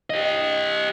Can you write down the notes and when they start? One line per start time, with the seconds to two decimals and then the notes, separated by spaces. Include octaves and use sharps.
0.10 G4 D#5